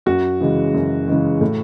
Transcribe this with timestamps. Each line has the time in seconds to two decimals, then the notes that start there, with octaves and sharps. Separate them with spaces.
0.06 F#2 F#4
0.40 C#3 E3 G#3
0.74 F#2
1.08 C#3 E3 G#3
1.41 A2